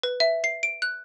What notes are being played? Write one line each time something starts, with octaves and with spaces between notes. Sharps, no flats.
B4
E5
C7
D7
F#6